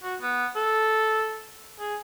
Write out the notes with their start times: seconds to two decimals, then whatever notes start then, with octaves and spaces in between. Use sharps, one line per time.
0.03 F#4
0.21 B3
0.56 A4
1.80 G#4